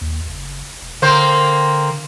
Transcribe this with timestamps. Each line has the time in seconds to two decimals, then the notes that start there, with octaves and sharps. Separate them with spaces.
0.01 D#2
0.28 F#1
0.82 E1
1.02 D3 A#3 C4 C5